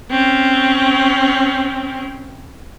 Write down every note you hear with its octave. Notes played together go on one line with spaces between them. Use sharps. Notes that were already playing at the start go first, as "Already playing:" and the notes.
C4 C#4